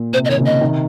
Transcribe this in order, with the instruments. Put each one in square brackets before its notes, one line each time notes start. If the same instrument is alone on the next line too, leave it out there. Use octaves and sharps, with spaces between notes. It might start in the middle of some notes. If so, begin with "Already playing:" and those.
Already playing: [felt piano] A#2
[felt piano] C3 [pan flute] C5
[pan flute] D#5
[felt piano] D#3 [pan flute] C#5
[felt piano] A#2 C#3
[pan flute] D#5
[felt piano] C3 D#3